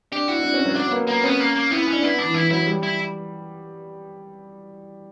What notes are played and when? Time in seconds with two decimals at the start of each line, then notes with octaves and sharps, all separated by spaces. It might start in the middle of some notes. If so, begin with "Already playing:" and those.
0.12 D4 G4
0.28 E4 F#4
0.39 D4
0.43 E4
0.54 C#4
0.65 F#3
0.76 F#3 D4
0.88 B3
0.92 A#3
1.07 A#3 B3
1.24 B3 C#4
1.40 A#3
1.56 A#3
1.71 B3 E4
1.82 E4
1.87 C#4
1.93 D4
2.02 B3 E4
2.14 B3 D4
2.24 E3
2.34 E3 E4
2.51 F#3 E4
2.67 G3
2.83 E4